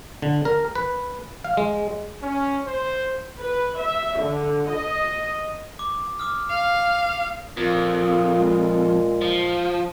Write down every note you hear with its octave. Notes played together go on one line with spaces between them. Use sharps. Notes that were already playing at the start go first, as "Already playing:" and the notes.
D3
A#4
B4
F5
G#3
C#4
C5
B4
E5
D3
D#5
D6
D6 D#6 F6
F5
F2 A#2 F4
G#3
F3